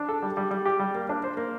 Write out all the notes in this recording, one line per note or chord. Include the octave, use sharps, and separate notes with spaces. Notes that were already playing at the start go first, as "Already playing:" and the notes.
Already playing: D4
A4
G3
G3
G3
G4
G3
A#3
D4
C5
A#3